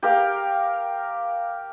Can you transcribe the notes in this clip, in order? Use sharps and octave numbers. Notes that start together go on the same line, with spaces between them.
G4 A#4 F5